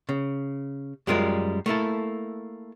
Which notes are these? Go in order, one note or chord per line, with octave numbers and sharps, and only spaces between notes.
C#3
F#2 G3 G#3 F4 A#4
A3 A#3 E4 A4